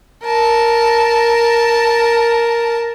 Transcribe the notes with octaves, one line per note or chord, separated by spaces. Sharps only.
A#4 A5